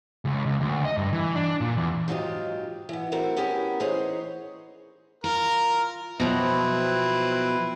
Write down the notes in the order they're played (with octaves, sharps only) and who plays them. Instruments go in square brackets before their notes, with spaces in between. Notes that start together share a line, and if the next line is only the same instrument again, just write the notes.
[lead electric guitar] C#2
C#2
D2
D#5
G2
E3
D4
A#2
E2
[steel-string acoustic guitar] G#2 F#3 D#4 F4 G4
E3 B3
G3 A3 C4 E4 F#4 A#4
B3 C#4 E4 G4 A#4
E3 D#4 G#4 C5 C#5
[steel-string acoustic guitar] F4 [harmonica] A#4
[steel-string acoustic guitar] B2 F3 F#3 [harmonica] C4 E4 B4